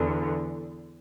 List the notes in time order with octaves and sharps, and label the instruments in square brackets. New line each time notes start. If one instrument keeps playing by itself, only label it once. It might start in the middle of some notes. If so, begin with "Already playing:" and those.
Already playing: [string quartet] E2 D3